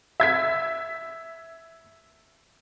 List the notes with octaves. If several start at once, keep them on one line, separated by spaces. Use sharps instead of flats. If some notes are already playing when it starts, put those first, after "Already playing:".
E5 G#6 B6